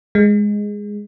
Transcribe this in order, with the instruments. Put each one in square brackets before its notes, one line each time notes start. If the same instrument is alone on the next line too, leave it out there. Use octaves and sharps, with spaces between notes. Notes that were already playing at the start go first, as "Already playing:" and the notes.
[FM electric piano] G#3